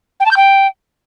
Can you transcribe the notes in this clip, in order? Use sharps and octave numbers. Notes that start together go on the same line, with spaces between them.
G5
A5
G6
G5